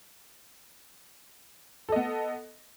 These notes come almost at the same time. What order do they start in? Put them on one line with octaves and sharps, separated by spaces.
A4 D#5 B3